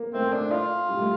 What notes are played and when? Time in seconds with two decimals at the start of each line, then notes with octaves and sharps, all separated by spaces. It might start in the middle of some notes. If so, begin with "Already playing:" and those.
Already playing: A#3
0.13 A3 C4
0.33 D4
0.51 F4
0.89 G3
0.99 A3